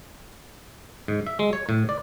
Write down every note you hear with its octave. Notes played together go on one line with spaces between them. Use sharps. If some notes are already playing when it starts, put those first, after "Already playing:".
G#2
E5
G#3
C#5
A2
D5